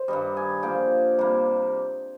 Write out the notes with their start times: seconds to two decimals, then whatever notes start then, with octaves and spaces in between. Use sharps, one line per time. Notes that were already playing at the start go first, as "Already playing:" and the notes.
Already playing: C5
0.08 G2 D#3 G3 D#5
0.37 G#5
0.63 D3 F3 A#3 G5
1.18 C3 G3 A#3